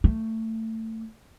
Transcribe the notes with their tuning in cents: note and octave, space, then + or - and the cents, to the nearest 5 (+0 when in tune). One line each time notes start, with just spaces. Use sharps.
A3 +20